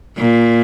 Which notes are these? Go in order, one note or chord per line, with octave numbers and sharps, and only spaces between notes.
A#2